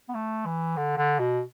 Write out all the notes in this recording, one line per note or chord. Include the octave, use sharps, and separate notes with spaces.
B3
A3
E3
D3
D3
B2